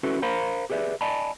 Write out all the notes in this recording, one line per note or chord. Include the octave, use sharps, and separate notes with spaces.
C#4 E4 F#4 A4 B4
A#4 C5 F5 A#5 B5
G4 G#4 B4 D5 E5
D5 D#5 G#5 A5 B5